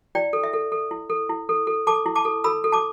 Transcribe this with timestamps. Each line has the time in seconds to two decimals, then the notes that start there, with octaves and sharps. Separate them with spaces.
0.15 E4 D5 G5
0.33 A4
0.43 E5
0.53 A4
0.72 A4
0.91 E4
1.10 A4
1.29 E4
1.49 A4
1.67 A4
1.87 A4 A5 D6
2.06 E4
2.15 A5 D6
2.25 A4
2.44 A4 B5 E6
2.64 A4
2.72 A5 D6